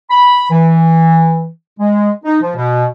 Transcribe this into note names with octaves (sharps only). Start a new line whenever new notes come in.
B5
E3
G#3
D#4
F3
B2